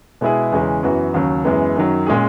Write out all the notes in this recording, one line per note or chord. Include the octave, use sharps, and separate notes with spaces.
B2 G#3 B3 E4 G#4
E2 C#3 E3 G#3 C#4
F#2 E3 B3 F#4
D#2 C#3 F#3
F#2 E3 G#3 B3
F#2 D#3 F#3
A#2 G#3 C#4 G#4